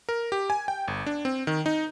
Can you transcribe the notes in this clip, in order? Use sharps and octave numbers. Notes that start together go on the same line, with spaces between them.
A#4
G4
G#5
G5
G1
D4
C4
D#3
D#4